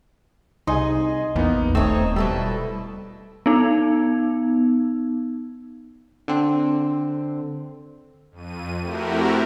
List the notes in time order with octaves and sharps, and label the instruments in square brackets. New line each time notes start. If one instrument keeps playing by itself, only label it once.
[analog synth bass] C2 [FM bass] D#4 [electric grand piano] G#4 G#5 C6 [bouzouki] D#5
[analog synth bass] A#1 [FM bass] E2 [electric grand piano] A#3 B3 D#4
[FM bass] D#1 [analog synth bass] A3 [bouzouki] C4 D#4 C#5 [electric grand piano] C5
[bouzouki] B2 E4 A4 [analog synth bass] G3
[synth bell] B3 D#4
[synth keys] D3 C4
[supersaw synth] F2 D#7
A3 C4 E4 F#4 G4 A#4